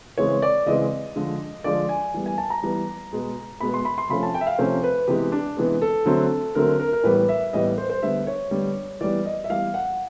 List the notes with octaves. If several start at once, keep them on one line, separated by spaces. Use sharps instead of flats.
C#3 E3 G#3 C4 C#5
D5
C#3 E3 G#3 C4 D#5
D3 F3 G#3
D3 F3 G#3 D5
G#5
E3 G3 B3
G#5
A5
A#5
E3 G3 B3
B2 G#3 B3
B2 G#3 B3 B5
C6
B5
C6
C3 F3 A3 C#4 B5
A5
G5
E5
F5
C3 F3 A3 C#4 C5
B4
C3 E3 G#3 B3 G4
D4
C3 E3 G#3 B3
A4
D3 F#3 A3 C4
D3 F#3 A3 C4 A#4
A#4
A#4
A2 E3 G3 B3 B4
E5
A2 E3 G3 B3 D#5
C5
C5
D3 G3 B3 E5
C#5
D3 G3 B3
E3 G3 B3 D5
D#5
E5
E3 G3 B3 F5
F#5